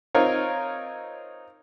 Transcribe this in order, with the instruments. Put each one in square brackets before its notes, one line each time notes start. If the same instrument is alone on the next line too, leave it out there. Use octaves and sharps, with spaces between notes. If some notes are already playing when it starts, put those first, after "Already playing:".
[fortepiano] C4 D#4 F4 A#4 C#5